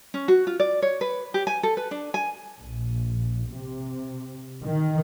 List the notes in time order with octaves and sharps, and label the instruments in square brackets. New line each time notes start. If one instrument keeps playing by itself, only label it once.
[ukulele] C#4
F#4
F4
D5
C#5
B4
G4
G#5
A4
B4
D4
G#5
[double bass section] A#1
C3
D#3